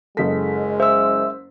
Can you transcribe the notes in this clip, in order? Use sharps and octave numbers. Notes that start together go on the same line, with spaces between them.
F#1 G#3 A4 D#5 B6
C5 E5 E6